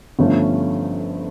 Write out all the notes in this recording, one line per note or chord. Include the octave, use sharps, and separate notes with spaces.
G1 G2 F3 A3 C#4